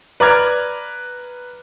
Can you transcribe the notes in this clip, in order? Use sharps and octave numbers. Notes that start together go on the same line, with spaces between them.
B4 D5 A#5 D6 F6 G#6